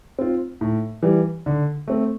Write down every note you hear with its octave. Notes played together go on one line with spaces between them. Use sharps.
C4 F4
A2
E3 G3
D3
A3 C4